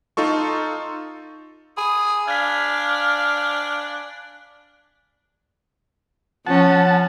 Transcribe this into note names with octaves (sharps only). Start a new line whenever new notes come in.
D#4 F4 A4 C#6
G#4 G#5 B5
D4 F5 G#6 B6
F#6 F#7
F3 C#4 F#5 A5